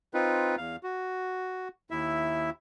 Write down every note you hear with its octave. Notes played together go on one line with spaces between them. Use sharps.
C4 D#4 F4 B4
E2 F5
F#4
D#2 E4 E5